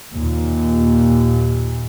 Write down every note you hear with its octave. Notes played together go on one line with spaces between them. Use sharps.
D#2 A#2